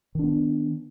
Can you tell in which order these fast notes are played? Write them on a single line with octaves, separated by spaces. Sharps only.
D#3 D4 B3